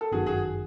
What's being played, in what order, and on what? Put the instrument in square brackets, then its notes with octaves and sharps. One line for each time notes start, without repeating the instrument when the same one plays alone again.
[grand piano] A4
[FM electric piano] G1 F#2 D#3 [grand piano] F#4 G#4
[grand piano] F#4 G#4